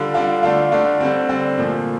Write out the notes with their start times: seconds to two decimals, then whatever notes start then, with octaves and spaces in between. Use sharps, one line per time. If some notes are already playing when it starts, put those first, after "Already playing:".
Already playing: D3 G3 D4 F4
0.14 D3 G3 D4 F4
0.43 D3 A3 D4 F4
0.72 D3 A3 D4 F4
1.00 D3 G3 C4
1.29 D3 G3 C4
1.58 A#2 F3 A3